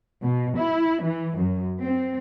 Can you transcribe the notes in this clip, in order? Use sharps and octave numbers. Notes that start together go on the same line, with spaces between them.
B2
E4
E3
F#2
C4